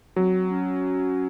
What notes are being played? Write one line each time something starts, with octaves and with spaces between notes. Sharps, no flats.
F#3 C4
C#4